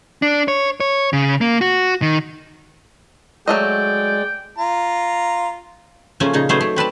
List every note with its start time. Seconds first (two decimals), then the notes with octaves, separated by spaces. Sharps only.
0.22 D4
0.48 C#5
0.80 C#5
1.13 C#3
1.41 A#3
1.61 F#4
2.02 D#3
3.48 F#3 G#3 A3 D5 D#5 G5
4.58 F4 A#5
6.20 C#3 F3 A3 A#3 C#4 G#5
6.33 A#2 C#3 D#4
6.49 F#3 A3 B3 C#4 G#4 C5
6.61 A3
6.76 C4 B4 D5 A5